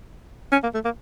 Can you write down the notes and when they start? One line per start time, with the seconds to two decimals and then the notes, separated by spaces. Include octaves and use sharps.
0.52 C#4
0.63 A#3
0.74 A3
0.84 A#3